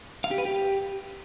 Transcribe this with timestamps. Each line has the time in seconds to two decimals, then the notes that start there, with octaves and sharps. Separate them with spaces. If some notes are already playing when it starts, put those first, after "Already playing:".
0.24 F5
0.31 G4
0.38 B4
0.45 G4